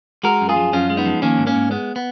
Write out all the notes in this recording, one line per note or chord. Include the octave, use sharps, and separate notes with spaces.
G#3 F#4 A#4
F#2
F4 G#4
F3
F#2 C#4 F4
G#3
B3 D#4
F3
D#3 A#3 C#4
G#2
A#3 C#4
G#2
G#3 B3
B3